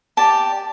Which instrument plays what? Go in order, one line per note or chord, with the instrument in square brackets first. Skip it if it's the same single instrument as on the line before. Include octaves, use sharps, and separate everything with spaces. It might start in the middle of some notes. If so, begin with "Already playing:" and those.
[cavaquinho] G4 D5 A5